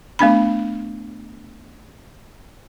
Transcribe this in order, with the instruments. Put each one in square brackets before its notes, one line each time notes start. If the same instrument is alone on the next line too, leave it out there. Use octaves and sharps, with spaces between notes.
[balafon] A3 B3 D4 B5